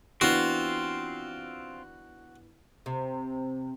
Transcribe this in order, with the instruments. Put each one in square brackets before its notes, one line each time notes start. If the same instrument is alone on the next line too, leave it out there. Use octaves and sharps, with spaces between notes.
[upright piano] E3 B3 D4 [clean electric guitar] C4 F4 [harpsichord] F#4
[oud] C3